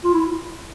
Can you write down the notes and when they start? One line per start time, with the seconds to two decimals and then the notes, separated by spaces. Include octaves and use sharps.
0.04 F4
0.14 E4